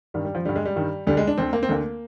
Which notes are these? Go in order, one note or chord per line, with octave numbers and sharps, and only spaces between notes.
G2 D#3 G3
G3
F3
G2 D3 G3
G#3
G3
G2 D#3
D2 D3 G3
G#3
D4
D2 D3 C4
A#3
C4
D2 D3 A#3